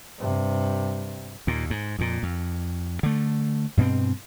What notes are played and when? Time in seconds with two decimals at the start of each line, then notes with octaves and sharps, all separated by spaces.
0.18 G2 C3
1.47 D#2 A#2
1.70 G#2
1.99 F2 A#2
2.23 F2
3.03 D3 A3
3.77 G2 B2 A3 C4